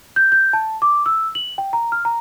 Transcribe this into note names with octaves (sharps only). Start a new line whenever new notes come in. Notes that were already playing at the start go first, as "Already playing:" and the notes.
G6
G6
A5
D6
E6
F#7
G5
A#5
F6
A#5